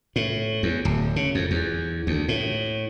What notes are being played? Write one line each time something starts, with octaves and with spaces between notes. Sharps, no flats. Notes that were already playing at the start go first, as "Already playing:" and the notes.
A2
E2
D1
C#3
F2
E2
D2
A2